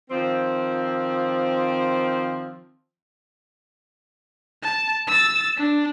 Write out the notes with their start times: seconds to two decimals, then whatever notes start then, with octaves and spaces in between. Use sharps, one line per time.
0.11 D#3 F3 C4
4.63 A5
5.07 E6 A6
5.57 D4